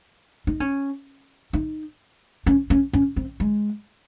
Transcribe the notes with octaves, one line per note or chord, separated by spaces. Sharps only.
D#4
C#4
D#4
C#4
C#4
C#4
C4
G#3